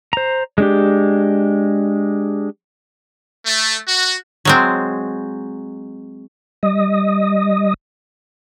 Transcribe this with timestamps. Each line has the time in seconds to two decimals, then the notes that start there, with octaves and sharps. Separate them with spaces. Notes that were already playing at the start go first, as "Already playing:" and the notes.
0.13 C5 A#5
0.58 G#3 D4 G4
3.46 A3
3.88 F#4
4.45 F#3 G#3 C4
6.63 G3 D#5 D#6